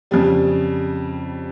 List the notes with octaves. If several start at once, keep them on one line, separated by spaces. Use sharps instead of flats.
F2 C#3 G3